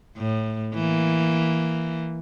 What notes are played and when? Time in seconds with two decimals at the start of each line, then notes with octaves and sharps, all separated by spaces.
0.17 A2
0.74 E3 A#3